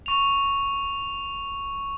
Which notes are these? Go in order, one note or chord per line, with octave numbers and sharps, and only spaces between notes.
C#6 F7